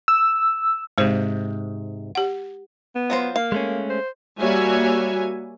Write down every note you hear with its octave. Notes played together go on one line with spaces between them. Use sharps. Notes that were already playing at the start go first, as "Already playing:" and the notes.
E6
G#2 C3 G#3 C5
G4 F#5
B3
F#3 F4 C5
A#3 F5
G#3 A3 C#4
C5
G3 A#3 F#4 C#5 E5 G#5